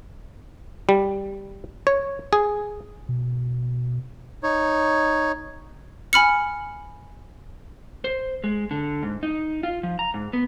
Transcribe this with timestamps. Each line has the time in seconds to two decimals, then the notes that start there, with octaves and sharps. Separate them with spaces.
0.89 G3
1.87 C#5
2.33 G#4
3.09 B2
4.43 D#4 C#5
6.13 G#5 B5 F6 C#7
8.04 C5
8.44 G#3
8.71 D3
9.03 G#2
9.23 D#4
9.63 F4
9.83 F3
9.99 A#5
10.14 G#2
10.33 B3